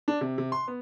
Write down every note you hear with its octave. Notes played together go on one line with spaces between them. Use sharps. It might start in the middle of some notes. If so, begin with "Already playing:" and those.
D4
C3
C3
C6
B3